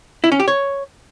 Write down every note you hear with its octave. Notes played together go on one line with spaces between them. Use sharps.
E4
C#4
G4
C#5